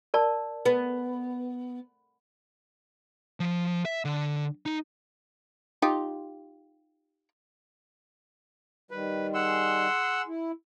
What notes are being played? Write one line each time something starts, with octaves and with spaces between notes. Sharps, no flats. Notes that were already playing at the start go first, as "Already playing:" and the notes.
A#4 D5 A5
B3
F3
E5
D3
D#4
D#4 F4 G4
D#3 G3 B4
G#4 F#5 C6 E6
E4